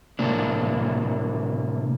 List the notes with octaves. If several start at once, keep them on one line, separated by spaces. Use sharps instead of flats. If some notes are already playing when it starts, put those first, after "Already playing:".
A2 C3 A#3 D4